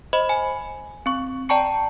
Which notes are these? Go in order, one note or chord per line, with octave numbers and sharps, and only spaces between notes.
C5 D#5 B5
G#5
C4 C#6
D5 G5 A5 A#5 C#6 C#7